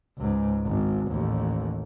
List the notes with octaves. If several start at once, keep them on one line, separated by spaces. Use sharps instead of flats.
C#2 G#2
G#1
A1 D#2